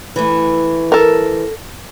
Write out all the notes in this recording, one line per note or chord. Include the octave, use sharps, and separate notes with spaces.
E3 A3
A4 A#4